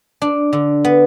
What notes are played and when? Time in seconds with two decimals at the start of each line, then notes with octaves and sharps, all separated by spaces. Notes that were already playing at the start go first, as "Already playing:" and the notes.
0.22 D4
0.53 D3
0.84 B3